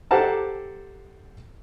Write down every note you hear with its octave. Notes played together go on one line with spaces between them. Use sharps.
G4 A4 C5 F#5 A5 A#5